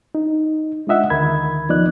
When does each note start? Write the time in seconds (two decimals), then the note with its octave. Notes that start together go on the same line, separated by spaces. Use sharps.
0.15 D#4
0.87 G#3 D4 F4 D#5 E5 F#5
1.10 D2 D#3 A#4 B5 G#6
1.69 F3 B3 D#4 D5 D#5 F#6